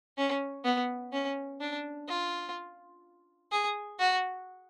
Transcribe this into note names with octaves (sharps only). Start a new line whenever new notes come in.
C#4
B3
C#4
D4
F4
G#4
F#4